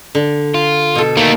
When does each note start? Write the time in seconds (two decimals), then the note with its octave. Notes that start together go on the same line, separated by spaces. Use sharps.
0.15 D3
0.54 F4
0.95 B2 A4
1.17 A3 A#3 D#4